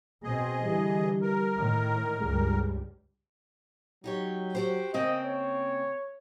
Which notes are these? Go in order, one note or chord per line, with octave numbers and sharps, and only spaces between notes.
B2 C4 G#4 D#5
D3 E3 G3
A#4
A2 D#3
C#2 G2 G3 G#3
F#3 D#4 G4 C#5
F#4 G4 C5
C#3 A#3 C4 D#5
C#5